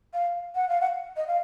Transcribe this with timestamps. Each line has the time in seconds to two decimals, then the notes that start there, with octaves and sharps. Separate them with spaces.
0.14 F5
0.55 F#5
0.69 F5
0.81 F#5
1.17 D#5
1.27 F5